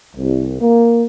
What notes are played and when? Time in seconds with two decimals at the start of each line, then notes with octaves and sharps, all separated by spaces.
0.15 C2
0.61 A#3